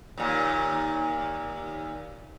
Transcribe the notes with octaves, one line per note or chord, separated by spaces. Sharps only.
D#2 A#2